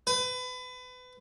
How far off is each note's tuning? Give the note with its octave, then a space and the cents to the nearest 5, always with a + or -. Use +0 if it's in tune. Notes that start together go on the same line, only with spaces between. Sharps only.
B4 +30